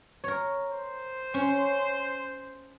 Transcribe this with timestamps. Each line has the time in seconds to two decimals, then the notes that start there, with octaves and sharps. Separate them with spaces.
0.24 A#4 C#5
0.71 C5
1.34 C#4